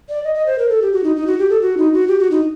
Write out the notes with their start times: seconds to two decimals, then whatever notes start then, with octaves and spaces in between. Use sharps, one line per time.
0.09 D5
0.24 D#5
0.35 D#5
0.46 C5
0.59 A#4
0.69 A4
0.82 G4
0.93 F#4
1.04 D#4
1.16 D#4
1.27 F#4
1.39 G4
1.50 A4
1.62 F#4
1.78 D#4
1.93 F#4
2.08 G4
2.19 F#4
2.31 D#4